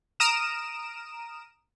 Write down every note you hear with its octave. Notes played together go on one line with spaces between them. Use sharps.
A#5 D#6 F6 D7 E7